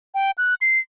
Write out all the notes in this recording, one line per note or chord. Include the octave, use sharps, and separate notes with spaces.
G5
F#6
C7